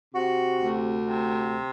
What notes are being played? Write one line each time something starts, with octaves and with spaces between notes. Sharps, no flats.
C3 F#4
D2
C3